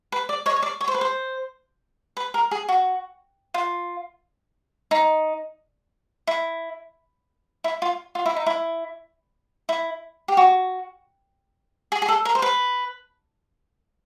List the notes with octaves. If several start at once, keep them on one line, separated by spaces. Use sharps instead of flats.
B4
D5
C#5 D#5
C#5
D5
C#5
C5
B4
C5
B4
A#4
G#4
F#4
F4
D#4
E4
E4
F4
F4
E4
D#4
E4
E4
G4
F#4
G#4
G#4
A4
A#4
C5
B4